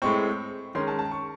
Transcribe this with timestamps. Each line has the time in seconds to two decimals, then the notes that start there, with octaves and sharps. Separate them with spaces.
0.02 A2 G#3 C4 C#6
0.75 D#3 G#3 C#4 C6
0.88 A5
0.99 A5
1.11 C#6